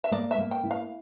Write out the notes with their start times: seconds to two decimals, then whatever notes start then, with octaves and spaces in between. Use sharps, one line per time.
0.04 E5
0.11 A#3 D5
0.31 E5
0.38 A#3
0.51 G5
0.64 E4
0.71 F5